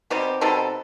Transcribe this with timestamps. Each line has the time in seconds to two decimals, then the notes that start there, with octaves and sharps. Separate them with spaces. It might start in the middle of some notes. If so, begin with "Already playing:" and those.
0.10 B2 G3 C4 D#4 G4
0.41 B2 G3 C4 D#4 A4